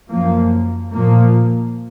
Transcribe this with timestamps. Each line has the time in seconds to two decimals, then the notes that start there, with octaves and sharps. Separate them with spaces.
0.11 F#2 F3 A#3
0.94 A#2 F3 A#3